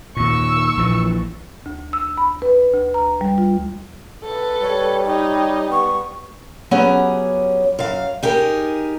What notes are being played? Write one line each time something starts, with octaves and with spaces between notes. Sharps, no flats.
D#2 A#2 C#6 E6
A#1 A#2 E3
D2
E6
B5
B4
D2
A#5
G3
F4
A4 B4
G3 C#5
D#4 G4 C#5
B3 C#6
F#3 B3 C#4 G4 G#4
F#2 F5
D#4 G4 G#4 A#4